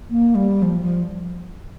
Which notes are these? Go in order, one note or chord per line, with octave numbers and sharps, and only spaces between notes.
A#3
G3
F3
F3